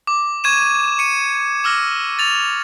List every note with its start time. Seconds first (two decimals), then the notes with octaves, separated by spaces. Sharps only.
0.07 D6
0.44 C#6 G#6 D#7 E7
0.98 C#6 C#7 D#7
1.64 D6 E6 F6 A#6
2.19 A6 F7